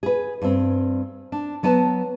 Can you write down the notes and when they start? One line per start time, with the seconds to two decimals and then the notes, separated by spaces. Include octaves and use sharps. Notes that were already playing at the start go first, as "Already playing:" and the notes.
0.03 G#4 B4
0.42 G2 C4
1.32 D4
1.63 F#3 B3 B4 A5